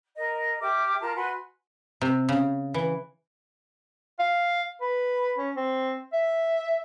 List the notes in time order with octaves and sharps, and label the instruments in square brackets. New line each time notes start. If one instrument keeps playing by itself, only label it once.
[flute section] A#4 D#5
G4 E5 D6 F6
F4 A#4 A5 A#5
F#4 B4 G#5 C6
[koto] C3
C#3
E3
[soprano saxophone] F5
B4
C#4
C4
E5